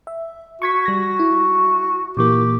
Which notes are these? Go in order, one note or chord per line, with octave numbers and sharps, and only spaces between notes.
E5
F#4 C#6 G#6 B6
G3 A#6
E4
A#2 E3 A#3 G4